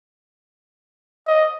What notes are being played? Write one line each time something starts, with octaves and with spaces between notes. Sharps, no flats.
D#5